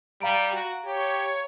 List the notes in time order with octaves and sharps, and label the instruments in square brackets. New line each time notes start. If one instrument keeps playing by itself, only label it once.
[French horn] G3 [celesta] F5 A#5 D7
[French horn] F#4
[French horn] G4 [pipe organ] C#5